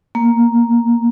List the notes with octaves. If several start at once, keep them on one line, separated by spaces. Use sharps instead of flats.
A#3